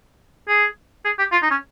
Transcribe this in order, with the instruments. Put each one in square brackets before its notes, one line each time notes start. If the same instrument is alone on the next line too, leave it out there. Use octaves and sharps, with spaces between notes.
[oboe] G#4
G#4
G4
F4
D#4
C#4